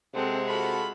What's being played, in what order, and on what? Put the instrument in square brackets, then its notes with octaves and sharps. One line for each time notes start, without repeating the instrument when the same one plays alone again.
[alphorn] C3 [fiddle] G#3 F#5 [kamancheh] C4 A4
[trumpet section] F4 B5 [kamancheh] F#4 A4